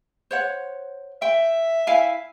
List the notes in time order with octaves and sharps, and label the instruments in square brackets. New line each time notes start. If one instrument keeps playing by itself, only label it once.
[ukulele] C5 C#5 F#5
[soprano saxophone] E5 [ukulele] G5
[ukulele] E4 F5 G#5